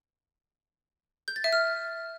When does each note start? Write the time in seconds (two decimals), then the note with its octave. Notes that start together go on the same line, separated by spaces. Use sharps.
1.28 G6
1.36 A6
1.44 E5
1.52 F6